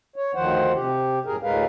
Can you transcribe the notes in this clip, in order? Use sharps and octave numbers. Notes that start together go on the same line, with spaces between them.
C#5
D2 D#3 F3 C5 F#5
C3 G4
F#2 A2 G#4 A#4
D2 A2 G#3 A#4 B4 F5